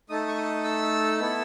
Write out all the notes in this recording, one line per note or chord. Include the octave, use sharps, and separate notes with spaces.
A3 D#4 A4 D#6
C#6
D#6
E6
B3 E4 A4